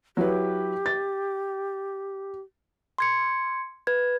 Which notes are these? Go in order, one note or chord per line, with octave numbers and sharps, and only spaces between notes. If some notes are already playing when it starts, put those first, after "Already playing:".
F#3 E4 G4 B4
A6
C6 G#6 C#7
B4 G#6